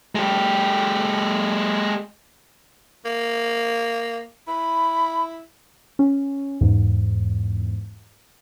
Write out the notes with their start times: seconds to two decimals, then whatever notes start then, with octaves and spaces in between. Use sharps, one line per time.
0.15 G#3 G4
3.05 A#3
4.48 E4 B5
5.99 C#4
6.61 E2 G#2